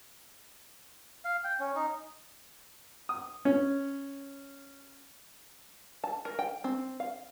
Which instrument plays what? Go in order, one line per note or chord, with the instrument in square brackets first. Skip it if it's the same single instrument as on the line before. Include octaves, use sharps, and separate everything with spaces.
[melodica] F5
G5
C#4
D#4
[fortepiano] D#6
C#4
[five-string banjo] A5
A#4
G5
C4
F5